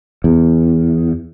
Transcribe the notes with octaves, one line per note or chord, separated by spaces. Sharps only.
E2